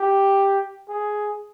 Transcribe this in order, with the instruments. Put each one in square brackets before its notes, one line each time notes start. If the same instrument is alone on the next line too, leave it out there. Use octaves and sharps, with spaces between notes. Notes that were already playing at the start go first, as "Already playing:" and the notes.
Already playing: [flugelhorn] G4
G#4